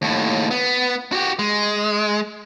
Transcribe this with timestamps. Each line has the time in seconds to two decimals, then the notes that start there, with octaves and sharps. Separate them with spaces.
0.02 D#2 A2
0.51 B3
1.12 F#4 G4
1.39 G#3